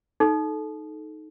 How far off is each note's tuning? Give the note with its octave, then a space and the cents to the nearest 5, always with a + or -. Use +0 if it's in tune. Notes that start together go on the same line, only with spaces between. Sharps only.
D#4 +0 A4 -25